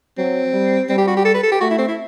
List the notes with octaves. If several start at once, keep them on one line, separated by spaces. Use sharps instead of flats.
F#3 C4
G3
G3 C4
G4
F#4
G4
A4
B4
A4
G4
A3 F#4
E4
C4
E4